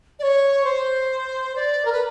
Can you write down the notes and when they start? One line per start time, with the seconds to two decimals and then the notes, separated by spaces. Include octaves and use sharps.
0.19 D5
0.23 C#5
0.64 C5
1.56 D5
1.85 A#4
1.92 B4